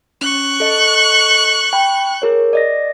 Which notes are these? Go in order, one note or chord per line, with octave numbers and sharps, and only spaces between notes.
C#4 C#6 F#6
A4 D#5
G5 B5
G#4 A#4 C#5
D5 D#5 A#6